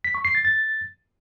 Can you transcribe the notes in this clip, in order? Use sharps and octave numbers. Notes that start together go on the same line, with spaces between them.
B6
C#6
C7
A6
A6